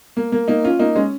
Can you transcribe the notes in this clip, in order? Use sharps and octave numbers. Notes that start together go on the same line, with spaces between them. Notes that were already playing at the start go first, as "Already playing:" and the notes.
A#3
A#3
A#3 D#4
C#4 F4
A#3 D#4
G#3 C#4